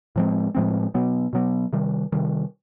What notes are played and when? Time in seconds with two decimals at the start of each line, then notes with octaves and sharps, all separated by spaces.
0.16 A2 F3 G#3 C4
0.55 A2 F3 G#3 C4
0.94 B2 F#3 B3
1.33 B2 F#3 B3
1.73 C3 D#3 G3
2.12 C3 D#3 G3